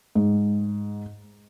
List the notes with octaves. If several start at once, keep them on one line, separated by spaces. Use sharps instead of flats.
G#2